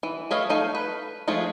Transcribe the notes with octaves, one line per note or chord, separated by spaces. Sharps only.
E3
A3 B4 C#5 D#5 F5
A3 D#4 A4 F5
B4
F3 G#3 A3 F4